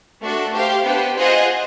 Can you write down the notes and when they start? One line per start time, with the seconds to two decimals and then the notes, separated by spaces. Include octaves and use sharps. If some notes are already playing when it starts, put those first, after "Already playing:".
0.20 A3 D4 F#4 A4
0.52 G4 C5 F5
0.84 B3 D4 G4 C5
1.16 F4 G#4 C5 D#5 F#5